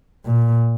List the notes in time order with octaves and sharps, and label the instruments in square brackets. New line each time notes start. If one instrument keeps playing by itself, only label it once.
[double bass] A#2